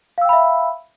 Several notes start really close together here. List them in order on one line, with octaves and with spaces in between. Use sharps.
F5 E6 G5 B5 E5